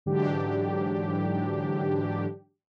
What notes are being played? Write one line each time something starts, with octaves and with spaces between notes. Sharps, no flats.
G#2 D3 E3 F#3 D4 G4